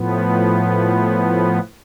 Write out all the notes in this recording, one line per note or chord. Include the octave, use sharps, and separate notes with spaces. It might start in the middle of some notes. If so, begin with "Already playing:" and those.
Already playing: A2 F3 B3